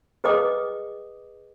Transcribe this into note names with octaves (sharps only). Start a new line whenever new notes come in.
G#4 B4 D#5 G5 D6 D#6